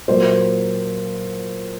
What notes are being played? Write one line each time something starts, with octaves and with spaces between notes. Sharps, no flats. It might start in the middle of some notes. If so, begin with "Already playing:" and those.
A#2 F#3 A#3 C5